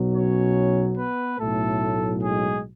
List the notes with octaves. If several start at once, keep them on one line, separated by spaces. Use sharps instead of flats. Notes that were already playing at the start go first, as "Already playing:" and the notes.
Already playing: B1 B2 F#3
C#4 C#5
B3 B4
B1 A2 F#3 A3 A4
G#3 G#4